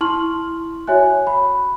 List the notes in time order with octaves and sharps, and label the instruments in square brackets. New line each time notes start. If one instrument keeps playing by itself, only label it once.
[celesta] E4 A5 C6 C#6 F6 F#7
F#4 C#5 E5 G#5 F#6
B5